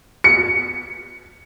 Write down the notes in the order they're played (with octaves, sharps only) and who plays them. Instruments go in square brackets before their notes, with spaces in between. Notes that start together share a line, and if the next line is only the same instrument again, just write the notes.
[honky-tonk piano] C#7